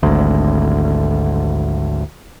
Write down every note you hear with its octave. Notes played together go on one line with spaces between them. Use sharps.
G#1 D2